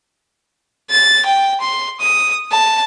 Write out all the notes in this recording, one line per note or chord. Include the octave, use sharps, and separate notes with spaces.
A6
G5
C6
D#6
A5